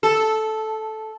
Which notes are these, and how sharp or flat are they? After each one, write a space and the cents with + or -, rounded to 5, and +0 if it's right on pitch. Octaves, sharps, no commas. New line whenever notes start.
A4 -10